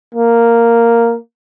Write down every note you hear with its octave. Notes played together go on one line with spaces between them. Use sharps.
A#3